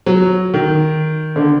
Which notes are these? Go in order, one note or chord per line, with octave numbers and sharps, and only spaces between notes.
F#3
D#3
D3